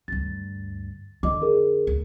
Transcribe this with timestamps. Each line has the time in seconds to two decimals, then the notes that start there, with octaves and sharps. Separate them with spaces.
0.08 D2 G2 A6
1.23 F2 D3 D#5 D6
1.42 G#4 A#4
1.87 D2